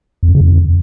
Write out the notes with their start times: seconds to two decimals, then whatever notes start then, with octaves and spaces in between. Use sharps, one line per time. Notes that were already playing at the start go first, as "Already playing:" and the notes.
0.23 F2
0.29 F#2
0.35 C#3
0.41 F2